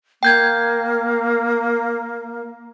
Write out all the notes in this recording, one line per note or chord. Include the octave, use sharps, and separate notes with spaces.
A#3 G5 G6 G#6